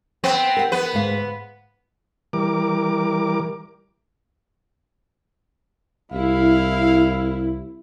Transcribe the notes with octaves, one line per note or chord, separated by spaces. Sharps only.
B3 C4
A#4 F#5
B3 B4
D2 G#2 F5
E3 G3 A#4 D6
C2 E4 F5